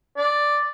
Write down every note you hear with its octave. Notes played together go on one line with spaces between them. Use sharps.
D5